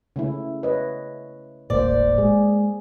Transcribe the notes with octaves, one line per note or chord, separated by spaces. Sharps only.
C#3 A3 E4
B4 C#5 D#5
D#1 G#1 A2 A#3 C5 D5
G#3 G#4